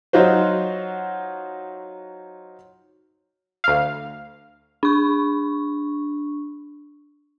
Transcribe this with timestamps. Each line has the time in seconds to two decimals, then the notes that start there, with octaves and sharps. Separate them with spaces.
0.13 F#3 D#4 F4 F#4 C5
3.64 D2 F5
4.83 D4 C#6